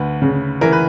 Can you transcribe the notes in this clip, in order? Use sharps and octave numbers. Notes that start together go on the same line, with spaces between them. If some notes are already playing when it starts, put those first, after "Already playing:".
Already playing: D2 B4
C#3
E3 A#4
B4